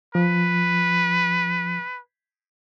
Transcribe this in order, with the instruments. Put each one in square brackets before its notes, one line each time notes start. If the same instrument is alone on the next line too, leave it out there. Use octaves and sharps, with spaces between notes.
[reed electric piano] F3 [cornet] B4